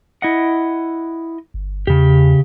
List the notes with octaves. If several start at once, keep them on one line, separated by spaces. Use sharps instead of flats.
E4 D#5 F#5
G1
E2 C#3 G4